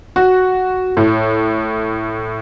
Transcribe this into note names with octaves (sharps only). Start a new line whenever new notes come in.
F#4
A2